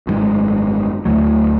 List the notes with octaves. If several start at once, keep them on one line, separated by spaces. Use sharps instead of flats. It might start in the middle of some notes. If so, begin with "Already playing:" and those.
G#1 F#2 C#3 G#3
D2 D3 F#3 A3